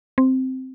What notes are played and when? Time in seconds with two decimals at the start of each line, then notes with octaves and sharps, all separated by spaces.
0.18 C4